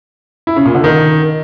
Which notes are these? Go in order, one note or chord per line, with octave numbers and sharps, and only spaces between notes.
E4
C#3
A#2
D3
D#3